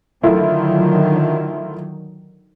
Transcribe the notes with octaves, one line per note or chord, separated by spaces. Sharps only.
D3 D#3 F#3 A3 E4 F4